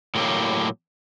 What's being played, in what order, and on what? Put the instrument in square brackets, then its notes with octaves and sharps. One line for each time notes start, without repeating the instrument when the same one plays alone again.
[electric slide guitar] A2 F#3 A#3 G4